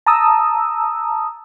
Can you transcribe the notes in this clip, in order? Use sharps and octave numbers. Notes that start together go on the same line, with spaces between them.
A5 A#5 D#6 E6